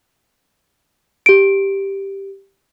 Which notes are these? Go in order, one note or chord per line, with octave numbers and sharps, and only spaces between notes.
G4 D7